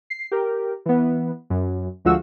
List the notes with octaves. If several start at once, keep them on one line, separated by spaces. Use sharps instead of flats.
C7
G4 A#4
E3 B3
F#2
D2 F3 G#3 F4 F#4 E6